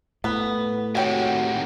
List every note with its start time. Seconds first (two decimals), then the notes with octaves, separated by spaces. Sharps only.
0.24 A2 B3 B4
0.95 D#2 C3 F#4 C#5 G5 G#5